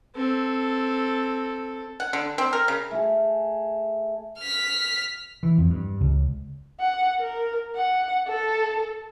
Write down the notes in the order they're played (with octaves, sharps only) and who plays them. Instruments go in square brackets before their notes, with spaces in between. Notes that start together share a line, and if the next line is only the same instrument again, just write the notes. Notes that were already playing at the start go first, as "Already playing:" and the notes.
[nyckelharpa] C4 A4
[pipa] F#5
D3
C4
A#4
C#3
[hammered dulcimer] A3 G#4
[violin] F6 B6
[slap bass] E3
F2
G2
C#2
[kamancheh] F#5
A#4
F#5
A4